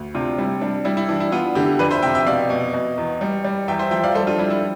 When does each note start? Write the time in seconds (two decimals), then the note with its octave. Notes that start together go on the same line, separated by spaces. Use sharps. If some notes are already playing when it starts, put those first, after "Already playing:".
Already playing: D2
0.14 C3 D4 F4
0.38 G3 E4
0.61 G3 D4
0.85 G3 E4
0.97 E4
1.09 E3 D4
1.20 E4
1.32 B3 D4 F4
1.55 D3 E4 G4
1.79 F2 B4 D5
1.91 C5 E5
2.02 C3 E5 G5
2.15 E5 G5
2.26 B2 D5 F5
2.50 B2
2.74 B2
2.98 E2
3.21 G3
3.45 G3
3.68 E2 E5 G5
3.79 C5 E5
3.91 F3 E5 G5
4.03 D5 F5
4.15 G3 A4 C5
4.27 D4 F4
4.38 G3 E4
4.50 E4